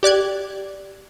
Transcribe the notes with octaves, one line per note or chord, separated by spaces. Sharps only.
G4 D5 F#6 G#6